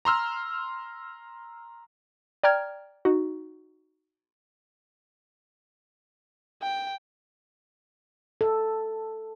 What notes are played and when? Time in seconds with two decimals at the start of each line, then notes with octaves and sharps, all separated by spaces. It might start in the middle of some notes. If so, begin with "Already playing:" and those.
0.05 A#5 C6 E6 F6
2.44 D5 G5 A#5 F6 G#6
3.05 D#4 F#4
6.62 G5
8.41 A4